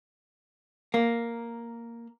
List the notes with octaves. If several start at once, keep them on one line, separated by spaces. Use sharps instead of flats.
A#3